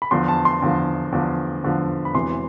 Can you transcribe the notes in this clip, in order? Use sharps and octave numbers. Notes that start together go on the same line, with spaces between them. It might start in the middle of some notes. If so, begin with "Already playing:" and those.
B5
E2 D3 F3 C6
A5
C6
E2 D3 F3
E2 D3 F3
E2 D3 F3
B5
E1 E2 C3 E3 C6